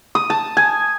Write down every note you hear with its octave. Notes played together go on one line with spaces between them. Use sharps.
D#6
A5
G#5